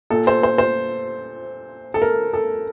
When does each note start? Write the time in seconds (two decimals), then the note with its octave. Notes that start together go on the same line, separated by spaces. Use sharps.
0.10 A#2 A4
0.27 C5
0.43 C5
0.58 C5
1.94 A4
2.02 A#4
2.33 A4